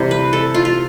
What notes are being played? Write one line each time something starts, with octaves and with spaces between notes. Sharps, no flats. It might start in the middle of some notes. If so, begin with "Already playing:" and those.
Already playing: C3 E3 G3
B4
A4
F4
F4